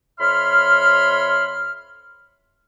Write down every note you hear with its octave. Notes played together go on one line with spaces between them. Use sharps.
F2 C#5 E5 B5 C6 F6